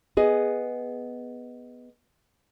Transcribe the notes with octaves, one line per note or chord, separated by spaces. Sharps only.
B3 G#4 D#5